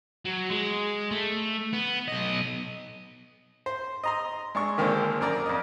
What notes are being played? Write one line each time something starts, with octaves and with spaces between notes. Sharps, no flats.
F#3
G#3
A3
B3
B1 D#5
C5
D#5 A#5 C6
G#3 D4 C#6
A#2 D3 D#3 G#3 A#3 C4
F#2 A#4 D5 A#5
F2 D#5